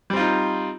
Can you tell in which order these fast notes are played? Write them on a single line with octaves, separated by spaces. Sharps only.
G3 C4 F4 D#4